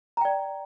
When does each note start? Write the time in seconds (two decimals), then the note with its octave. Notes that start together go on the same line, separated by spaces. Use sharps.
0.17 A#5
0.21 G5
0.25 D5